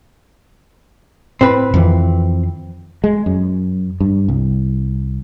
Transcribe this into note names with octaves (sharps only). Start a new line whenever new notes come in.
A2 C4 B4
F2 D#3 E3
G#3
F#2
G2
C2